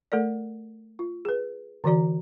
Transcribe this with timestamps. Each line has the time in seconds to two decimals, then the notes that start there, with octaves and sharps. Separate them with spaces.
0.12 A3 A4 A#4 D5
0.99 F4
1.25 G#4 B4
1.84 D3 E3 F#4 D5 A#5